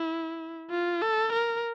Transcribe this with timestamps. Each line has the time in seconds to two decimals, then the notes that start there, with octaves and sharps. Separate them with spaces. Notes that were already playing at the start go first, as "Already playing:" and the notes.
Already playing: E4
0.71 F4
1.02 A4
1.32 A#4